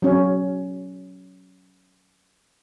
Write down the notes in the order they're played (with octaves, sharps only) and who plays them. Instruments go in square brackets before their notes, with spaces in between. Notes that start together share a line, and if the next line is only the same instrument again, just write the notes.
[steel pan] F#3 C#4